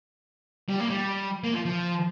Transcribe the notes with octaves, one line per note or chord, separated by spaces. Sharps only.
G3
A#3
G3
A#3
F3
F3